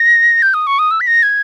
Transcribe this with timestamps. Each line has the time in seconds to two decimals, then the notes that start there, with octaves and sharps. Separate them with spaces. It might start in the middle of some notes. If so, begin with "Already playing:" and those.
Already playing: A#6
0.42 G6
0.54 D#6
0.67 C#6
0.79 D#6
0.91 E6
1.01 B6
1.07 A#6
1.23 G#6